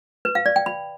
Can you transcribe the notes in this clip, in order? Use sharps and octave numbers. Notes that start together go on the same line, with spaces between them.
B4
F5
D5
G5
B5